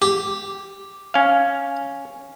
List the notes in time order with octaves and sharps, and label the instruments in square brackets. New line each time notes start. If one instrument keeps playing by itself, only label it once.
[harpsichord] G4
[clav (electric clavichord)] C#4 F5